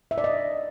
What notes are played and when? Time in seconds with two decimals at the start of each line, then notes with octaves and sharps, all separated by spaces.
0.11 E5
0.18 D5
0.24 D#5